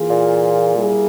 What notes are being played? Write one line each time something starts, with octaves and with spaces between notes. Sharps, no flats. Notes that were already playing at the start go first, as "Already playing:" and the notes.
Already playing: E3 A#3 F4 G#4
A#2
G3 A#3 E4 G#4